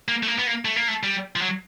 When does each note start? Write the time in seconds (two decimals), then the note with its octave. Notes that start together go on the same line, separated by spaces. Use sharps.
0.09 A#3
0.23 A3
0.28 A#3
0.39 B3
0.47 A#3
0.65 A3
0.76 A#3
0.88 A3
1.03 G3
1.36 F3
1.42 F#3